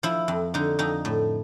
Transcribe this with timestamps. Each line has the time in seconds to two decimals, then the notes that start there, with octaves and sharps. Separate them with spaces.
0.03 F3 E4
0.28 F2
0.54 D3 D#4
0.79 F2 D#4
1.05 A2